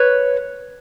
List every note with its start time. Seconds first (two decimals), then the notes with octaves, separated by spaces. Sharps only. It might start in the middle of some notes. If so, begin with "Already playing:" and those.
Already playing: B4 C#5